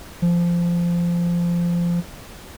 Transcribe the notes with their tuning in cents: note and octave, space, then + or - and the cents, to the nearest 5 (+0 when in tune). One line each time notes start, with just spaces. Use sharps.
F3 -15